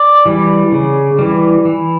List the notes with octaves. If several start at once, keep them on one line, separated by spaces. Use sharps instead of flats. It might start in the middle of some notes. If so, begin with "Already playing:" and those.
Already playing: D5
E3 G3
C#3
E3 G3
E3